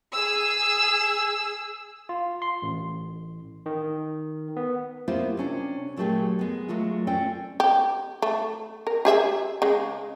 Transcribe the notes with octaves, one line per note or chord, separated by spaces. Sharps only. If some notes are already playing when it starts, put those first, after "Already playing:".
G#4 E6
F4
C6
A1
D#3
B3
A#3 B3 E4 F4 G4 C5
C3 C#4 D4
A#2 F#3 G#3 A3 G4 G#4
G#3 B3
F#3 G#3 A3 F4
C4 C#4 A4 D5 G5
G4
A3
A#4
G4 G#4 E5
C#3 G#3